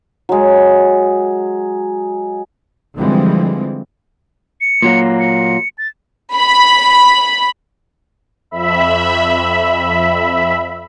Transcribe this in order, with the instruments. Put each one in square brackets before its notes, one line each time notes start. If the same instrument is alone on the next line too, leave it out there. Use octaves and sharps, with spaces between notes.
[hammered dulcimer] F#3 G#3
[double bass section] D3 E3 F3 G3 G#3 C4
[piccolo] C#7
[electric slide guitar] A#2 F#3 A#3
[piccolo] C#7
A6
[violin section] B5
[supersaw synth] F2 E5 B5